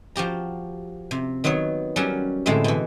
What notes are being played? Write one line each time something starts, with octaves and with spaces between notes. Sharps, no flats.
F3 F#4 G4 A#5
C3
D#3 F#3 B3 D#4 C#5
F#3 G3 C#4 F#4 G4 A#4
A2 D3 G#3 C4 E4 E5
B2 E3